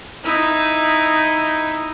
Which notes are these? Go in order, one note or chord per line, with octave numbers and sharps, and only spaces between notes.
D#4 E4